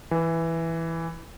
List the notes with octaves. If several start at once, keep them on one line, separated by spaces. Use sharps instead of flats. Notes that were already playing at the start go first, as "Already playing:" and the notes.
E3